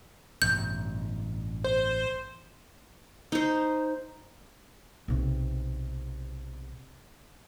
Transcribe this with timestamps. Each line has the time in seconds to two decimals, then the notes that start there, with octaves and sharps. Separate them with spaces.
0.42 A1 G2 B2 G6
1.64 C5
3.32 D#4 C5
5.08 B1 C3